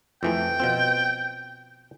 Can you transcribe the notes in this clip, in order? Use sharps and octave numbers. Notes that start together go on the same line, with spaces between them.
F2 E3 A3 G5
B2 F3 C4